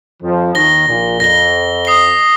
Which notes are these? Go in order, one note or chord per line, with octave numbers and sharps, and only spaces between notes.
F2 F3
D#2 D#3 A#6 G7
A#1 A#2
F2 A#6 G7
D#6 C7 G7